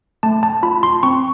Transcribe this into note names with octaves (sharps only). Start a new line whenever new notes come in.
A3 A5
A5
F4 B5
C6
C4 C#6